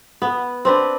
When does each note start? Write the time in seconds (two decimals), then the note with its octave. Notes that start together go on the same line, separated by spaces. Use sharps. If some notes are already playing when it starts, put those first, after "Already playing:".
0.22 B3
0.65 C4 D4 B4